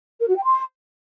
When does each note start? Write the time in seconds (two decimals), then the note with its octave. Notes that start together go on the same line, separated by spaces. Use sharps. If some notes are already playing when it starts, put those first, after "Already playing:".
0.19 A#4
0.27 F#4
0.35 G5
0.43 C6